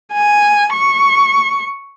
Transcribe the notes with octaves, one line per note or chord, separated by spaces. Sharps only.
G#5
C#6